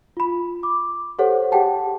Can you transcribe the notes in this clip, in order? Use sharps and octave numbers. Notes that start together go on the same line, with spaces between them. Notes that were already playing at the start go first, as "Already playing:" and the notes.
F4 B5
D6
G4 A4 C5 C#5 F#5
G4 G#4 F#5 G5 A5